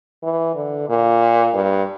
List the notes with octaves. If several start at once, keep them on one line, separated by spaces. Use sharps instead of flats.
E3
D3
A#2
G2